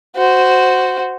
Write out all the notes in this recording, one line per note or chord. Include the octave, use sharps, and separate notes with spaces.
F#4 C5